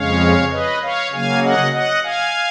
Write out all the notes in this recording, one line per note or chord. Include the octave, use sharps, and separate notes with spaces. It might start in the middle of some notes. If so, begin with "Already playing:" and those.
Already playing: F2 C#3 G#3 C#4 C#5 F5
B4 D#5
C#5 F5
C#3 F#3 A#3 F5 G#5
D#5 F#5
D#5 F#5
F5 G#5